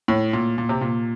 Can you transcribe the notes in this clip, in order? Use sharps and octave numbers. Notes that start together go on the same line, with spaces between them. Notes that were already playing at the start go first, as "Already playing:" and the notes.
A2
A#2
A#2
C3
A#2